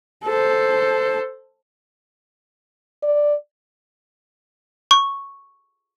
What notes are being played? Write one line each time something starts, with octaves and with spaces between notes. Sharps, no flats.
A4 C5
D5
C#6